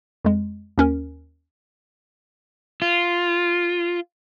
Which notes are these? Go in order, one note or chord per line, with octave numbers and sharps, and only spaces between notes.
F2 G#3
D#2 C#4 A#4
F4